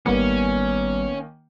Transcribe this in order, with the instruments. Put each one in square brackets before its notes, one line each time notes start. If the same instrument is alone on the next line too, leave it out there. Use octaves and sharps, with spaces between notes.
[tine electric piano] G#1 G3 C#7 [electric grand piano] D#3 A#3 [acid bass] B3 [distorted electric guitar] C#4